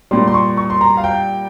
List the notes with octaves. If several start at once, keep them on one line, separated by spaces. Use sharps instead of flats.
A#2 G3 C6
C6
C#6
C#6
C6
A#5
F5
G5